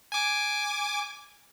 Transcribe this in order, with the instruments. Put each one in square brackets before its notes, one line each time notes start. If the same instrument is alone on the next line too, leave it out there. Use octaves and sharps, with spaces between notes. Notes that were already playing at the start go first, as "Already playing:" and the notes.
[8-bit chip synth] G#5 D6